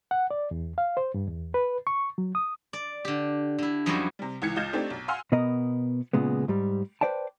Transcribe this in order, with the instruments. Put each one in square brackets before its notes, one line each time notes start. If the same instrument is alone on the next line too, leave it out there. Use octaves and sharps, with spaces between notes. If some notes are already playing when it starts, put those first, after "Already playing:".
[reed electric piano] F#5
D5
E2
F5
C5
G2
E2
B4
C#6
F#3
D#6
[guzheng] D5
D3 G4
D3 E4
F#2 F3 G3 D#4 E4 F#4
[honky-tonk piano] C3 G3
C#2 E3 G#6 C#7
C#2 F4 D#5 G6 A6 E7
A3 C4 D4 D#4 G4
B1
F5 F#5 G#5 C6 E6 F6
[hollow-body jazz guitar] B2 B3 A#4 D#5
A#2 C#3 G#3 B3
G#2 G3
B4 C5 D5 G5 A5